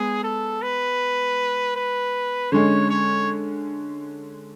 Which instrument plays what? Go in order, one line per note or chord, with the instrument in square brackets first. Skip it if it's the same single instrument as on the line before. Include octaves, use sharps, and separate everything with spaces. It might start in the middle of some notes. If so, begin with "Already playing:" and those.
Already playing: [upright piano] G#3 B3 [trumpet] G#4
[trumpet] A4
B4
B4
[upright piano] D3 G#3 C#4 [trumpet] C#5
[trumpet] C#5